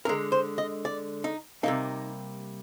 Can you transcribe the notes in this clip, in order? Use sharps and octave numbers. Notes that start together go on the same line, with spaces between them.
D3 G#3 A#4
C5
D#5
D5
D#4
C3 G3 A#3 D#4